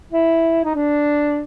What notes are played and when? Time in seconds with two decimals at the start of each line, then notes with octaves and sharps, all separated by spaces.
0.12 E4
0.64 D#4
0.75 D4